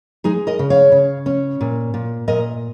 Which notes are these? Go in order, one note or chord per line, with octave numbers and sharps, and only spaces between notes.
G#3 D#4 G#4
A#4 D#5
C#3
C#5 F5
C#3
C#4
A#2
A#2
A#2 A#4 D#5